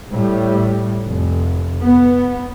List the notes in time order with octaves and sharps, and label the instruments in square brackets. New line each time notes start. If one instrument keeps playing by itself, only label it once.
[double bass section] A2 G3
F1
B3